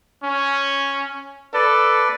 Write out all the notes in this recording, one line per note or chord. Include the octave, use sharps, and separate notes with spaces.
C#4
A4 B4 D5